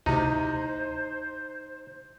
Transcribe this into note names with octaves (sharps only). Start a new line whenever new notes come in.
D2 C3 D#4 E4 C5